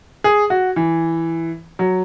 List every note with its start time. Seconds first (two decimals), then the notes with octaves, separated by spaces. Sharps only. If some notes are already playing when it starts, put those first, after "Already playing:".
0.24 G#4
0.50 F#4
0.76 E3
1.79 F#3